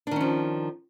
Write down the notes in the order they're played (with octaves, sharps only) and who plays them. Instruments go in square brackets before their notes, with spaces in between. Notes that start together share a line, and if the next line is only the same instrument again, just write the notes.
[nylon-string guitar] D4
D#3
C#4
F3